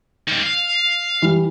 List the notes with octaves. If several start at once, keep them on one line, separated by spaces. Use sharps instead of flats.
D#3 G3
F5
E3 G3